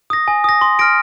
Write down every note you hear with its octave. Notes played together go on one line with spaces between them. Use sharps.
D#6 A#6
G#5
D#6 A#6
C6
F6 A#6 D7